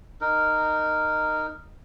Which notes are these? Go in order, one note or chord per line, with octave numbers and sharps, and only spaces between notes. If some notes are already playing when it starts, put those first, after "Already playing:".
D#4 A#4